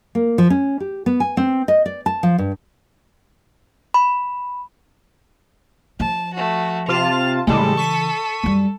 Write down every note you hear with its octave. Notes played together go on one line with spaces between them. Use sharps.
A#3
F3
C#4
G4
B3
G#5
C4
D#5
D5
A5
F3
G2
B5
F3 A5
A3 F#4
C3 F4 A5 F7
A2 C#3 E3 G3 G#3 A4
C#6 B6 D#7
F#2 G3